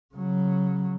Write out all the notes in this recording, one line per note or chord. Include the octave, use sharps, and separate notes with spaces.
C#3 F#3